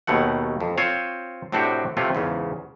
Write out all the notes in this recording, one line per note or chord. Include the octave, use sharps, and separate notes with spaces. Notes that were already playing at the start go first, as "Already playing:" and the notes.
D#2 B2 A3 F#5
F2
C4 F4 C5 C#5
A2 C3 C4 D4 F#4 G4
C3 A3 C4 C#4 F4
E2 G#2 C#3